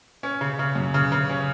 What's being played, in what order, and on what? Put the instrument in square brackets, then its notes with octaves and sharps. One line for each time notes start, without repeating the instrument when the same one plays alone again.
[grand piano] C#4
C#3
C#3
F#2
C#3
C#3
C#4